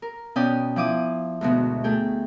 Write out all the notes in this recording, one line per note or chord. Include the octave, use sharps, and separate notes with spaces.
A#4
B2 C#4 D5 G5 D#6
F3 E4 D6 D#6
D2 G#2 B2
A3 G#4 G5